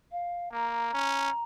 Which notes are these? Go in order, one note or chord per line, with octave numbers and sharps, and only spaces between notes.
F5
A#3 A#5
C#4